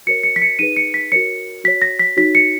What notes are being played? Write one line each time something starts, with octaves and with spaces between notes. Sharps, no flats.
F#4 A#4 C#5 C#7
C#7
B6
C#7
D#4 G#4 B4 D#7
C#7
B6
F#4 A#4 C#5 C#7
F#4 C#5 B6
A#6
B6
D#4 F#4 C#5 B6
C#7